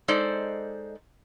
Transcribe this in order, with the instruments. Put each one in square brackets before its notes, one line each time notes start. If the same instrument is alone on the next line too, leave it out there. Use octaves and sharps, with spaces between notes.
[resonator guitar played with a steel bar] G#3 D#4 A4 C5 D5